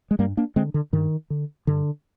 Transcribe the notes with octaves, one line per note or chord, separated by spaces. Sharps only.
G#3
G2 G3 A#3
A#3 D4
D3 G#3 C4
D3
G2 D#3
D3
G2 D3